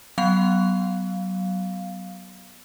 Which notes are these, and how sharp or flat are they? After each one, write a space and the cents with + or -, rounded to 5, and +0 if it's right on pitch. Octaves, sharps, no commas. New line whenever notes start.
F#3 +30 B3 +0 F5 +0